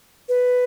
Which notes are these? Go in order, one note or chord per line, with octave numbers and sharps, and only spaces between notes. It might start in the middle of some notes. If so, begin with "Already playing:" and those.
B4